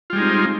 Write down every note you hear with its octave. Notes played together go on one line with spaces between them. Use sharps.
G3 G#3 C4 D#4 F4